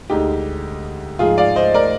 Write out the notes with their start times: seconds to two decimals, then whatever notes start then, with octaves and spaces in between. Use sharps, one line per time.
0.10 D2 D3 G#3 D#4 G4
1.19 G#2 F3 G#3 F4 G#4
1.38 D5 F5
1.56 C5 D#5
1.74 A#4 D5